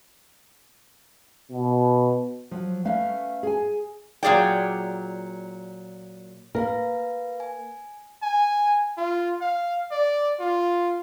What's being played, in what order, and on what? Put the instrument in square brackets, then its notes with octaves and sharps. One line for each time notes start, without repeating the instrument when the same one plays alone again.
[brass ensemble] B2
[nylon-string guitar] F3 F#3
A3 C#4 B4 F5
G#4 G#5
[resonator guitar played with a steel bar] A#2 F#3 G#4 D5 G5
[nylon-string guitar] A#3 A#4 [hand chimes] B4 F5 A#6
[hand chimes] G#5
[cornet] G#5
F4
F5
D5
F4